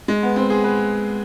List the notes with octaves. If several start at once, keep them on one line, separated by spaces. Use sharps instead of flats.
G#3
B3
C4
G#4
B4